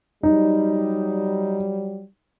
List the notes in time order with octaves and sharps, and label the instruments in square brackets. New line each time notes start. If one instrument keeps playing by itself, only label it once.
[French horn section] F#3 G3 [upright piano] D#4